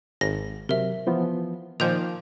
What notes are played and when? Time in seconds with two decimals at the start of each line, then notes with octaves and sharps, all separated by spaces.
0.21 G#1 A#6
0.69 C3 F#3 A#4 E5
1.07 E3 F3 B3
1.80 A#2 D#3 F3 D6 G6 F7